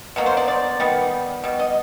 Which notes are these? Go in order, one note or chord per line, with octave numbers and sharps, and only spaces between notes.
B2 F#3 A#3
C5
D5
D5
D#3 G3 B3
B2 G3
D#5